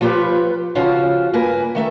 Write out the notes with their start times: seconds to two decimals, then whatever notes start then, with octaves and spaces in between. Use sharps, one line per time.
0.01 F3 F4 G4 A4 B4 C#5
0.75 C#3 F3 C#4 F4 F#4 C5
1.33 G2 A#3 B4 G#5
1.75 D#3 A3 E5